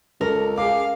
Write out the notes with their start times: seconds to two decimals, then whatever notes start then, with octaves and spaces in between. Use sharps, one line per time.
0.21 C#2 A4 A#4
0.58 G#4 F5 D6